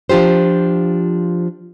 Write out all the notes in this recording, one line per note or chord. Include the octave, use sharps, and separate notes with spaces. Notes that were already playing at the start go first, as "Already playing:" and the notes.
F3 D4 F4 G4 C5